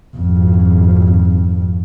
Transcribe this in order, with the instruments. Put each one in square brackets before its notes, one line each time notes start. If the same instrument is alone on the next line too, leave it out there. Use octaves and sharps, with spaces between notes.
[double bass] G#1 F2